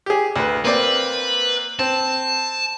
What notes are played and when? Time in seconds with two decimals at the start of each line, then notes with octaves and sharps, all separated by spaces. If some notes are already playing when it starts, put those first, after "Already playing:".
0.06 G4 G#4
0.36 D2 B4
0.65 A#3 C4 B4 D5
1.79 C4 A5